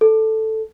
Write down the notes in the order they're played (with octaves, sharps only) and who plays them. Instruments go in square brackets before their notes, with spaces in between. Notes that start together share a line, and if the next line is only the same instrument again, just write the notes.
[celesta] A4